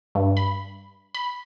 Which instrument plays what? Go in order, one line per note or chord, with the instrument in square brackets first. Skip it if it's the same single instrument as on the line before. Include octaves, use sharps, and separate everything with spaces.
[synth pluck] G2
B5
B5